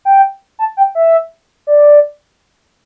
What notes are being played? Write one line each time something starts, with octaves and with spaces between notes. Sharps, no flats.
G5
A5
G5
E5
D5